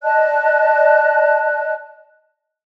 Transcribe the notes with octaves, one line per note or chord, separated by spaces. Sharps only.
D5 D#5 A5 F#6